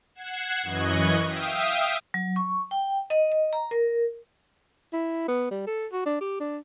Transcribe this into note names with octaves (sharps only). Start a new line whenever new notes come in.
F#5 G#6 C7 E7
F#2 E3 D#5 C#6 F#6 G#6
E5 F5 G5 D#6
F#3
C#6
G5
D#5
D#5
A#5
A#4
E4
B3
G3
A4
F#4
D4
G4
D4